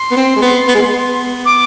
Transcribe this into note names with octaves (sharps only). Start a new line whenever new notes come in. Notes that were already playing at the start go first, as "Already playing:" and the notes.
Already playing: C6
B3
C4
G#3
B3
B3
G#3
B3
D6